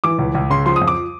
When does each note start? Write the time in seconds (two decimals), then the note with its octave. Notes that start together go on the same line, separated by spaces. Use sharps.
0.04 E3 D6
0.19 C#2
0.35 C#2
0.50 C#3 C6
0.66 F3 C6
0.76 D#6
0.82 F2
0.88 D6